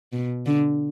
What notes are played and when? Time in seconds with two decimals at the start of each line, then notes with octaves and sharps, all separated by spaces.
0.13 B2
0.46 D3